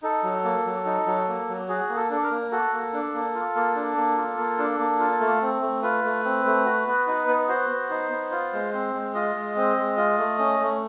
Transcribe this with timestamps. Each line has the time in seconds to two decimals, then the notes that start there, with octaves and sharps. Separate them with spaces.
0.03 D#4 A4
0.24 F#3
0.44 A#3
0.66 F#3
0.86 D#4
1.06 F#3
1.28 A#3
1.49 F#3
1.69 F#4 G#4
1.89 A#3
1.96 A4
2.10 D4 A4
2.23 A#4
2.31 A#3
2.52 F#4 A4
2.73 A#3
2.94 D4
3.14 A#3
3.35 F4
3.56 A#3
3.75 D4
3.97 A#3
4.17 F4
4.38 A#3
4.59 D4
4.79 A#3
5.00 F4
5.20 A3
5.42 C4
5.62 A3
5.83 F4 B4
6.04 A3
6.25 C4
6.45 A3
6.65 F#4
6.87 B3
7.07 D#4
7.28 B3
7.48 F#4 C5
7.70 B3
7.90 D#4
8.11 B3
8.31 F4
8.53 G#3
8.73 C4
8.94 G#3
9.14 F4 D#5
9.35 G#3
9.56 C4
9.77 G#3
9.97 F4
10.18 A3
10.39 C#4
10.60 A3